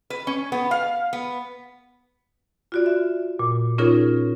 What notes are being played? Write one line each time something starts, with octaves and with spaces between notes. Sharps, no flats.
B4
C#4
B3
F5
B3
F4 F#4 D5
E5
A#2
C#4 D#4 F4 G#4 A#4 C#5